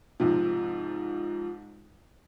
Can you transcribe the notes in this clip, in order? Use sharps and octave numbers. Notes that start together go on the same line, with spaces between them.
G#2 C3 F3